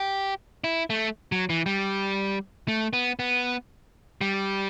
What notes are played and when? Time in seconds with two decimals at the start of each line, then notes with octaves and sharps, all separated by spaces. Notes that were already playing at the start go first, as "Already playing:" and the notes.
Already playing: G4
0.64 E4
0.90 A3
1.32 F#3
1.50 E3
1.66 G3
2.68 A3
2.93 B3
3.19 B3
4.21 G3